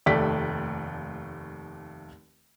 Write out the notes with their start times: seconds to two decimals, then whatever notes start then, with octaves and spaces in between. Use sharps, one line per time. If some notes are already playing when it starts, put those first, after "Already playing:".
0.06 F1 D#2 A3 D5 B6